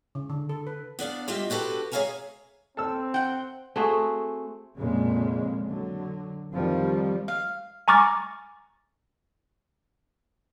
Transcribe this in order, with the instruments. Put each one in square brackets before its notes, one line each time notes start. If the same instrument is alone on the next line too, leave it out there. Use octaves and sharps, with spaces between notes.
[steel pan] C#3
D3
A4
B4
[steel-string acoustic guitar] B3 D4 D5 F5
G3 F4 G4 D#5 E5
D4 F#4 G4 A4 B4 G5
G#4 C#5 E5 F5 G#5 A#5
[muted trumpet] C4 [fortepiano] A4 E6
[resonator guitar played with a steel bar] F#5 G5
[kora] A3 C4 F#4 G#4
[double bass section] F2 A#2 C#3 G#3
D3 F#3
F2 D#3 F3 G3
[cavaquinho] F5
[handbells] G#5 A#5 C#6 D6 F6 A6